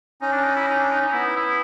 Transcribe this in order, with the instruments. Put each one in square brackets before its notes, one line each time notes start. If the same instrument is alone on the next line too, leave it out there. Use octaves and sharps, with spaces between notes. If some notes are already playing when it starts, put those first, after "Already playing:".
[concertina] C#4 [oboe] D#4
[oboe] D4
D#4
E4
D#4
D4
D#4
D#4
[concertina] B3 [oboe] E4
[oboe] E4